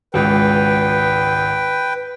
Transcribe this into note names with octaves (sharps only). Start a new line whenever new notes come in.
G#1 C#2 B4 G5